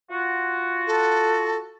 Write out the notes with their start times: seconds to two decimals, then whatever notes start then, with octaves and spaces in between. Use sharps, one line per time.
0.11 F4 F#4
0.87 A4